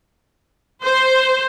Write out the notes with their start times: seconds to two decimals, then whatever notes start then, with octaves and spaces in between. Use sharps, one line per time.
0.83 C5